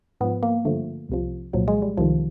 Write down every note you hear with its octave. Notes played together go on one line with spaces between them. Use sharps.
G#2 F3 B3
A#3
G2 D3 F3 A3
C2 C3 F3
C2 A#2 F3 F#3
G#3
G3
C2 C3 D#3 F3